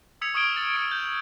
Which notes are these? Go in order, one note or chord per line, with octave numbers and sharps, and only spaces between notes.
D#6 E6 G#6 B6 C#7 F7
C#6 D#6 F6 G#6 D7 G7
A6 F#7
E6 C#7 D7
G6